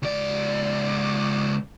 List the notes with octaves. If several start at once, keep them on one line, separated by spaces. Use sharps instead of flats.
C#2 D5